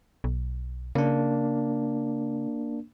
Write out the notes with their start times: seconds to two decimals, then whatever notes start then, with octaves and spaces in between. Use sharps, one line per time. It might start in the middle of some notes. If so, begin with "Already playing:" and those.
0.24 B1
0.95 C#3 A#3 D4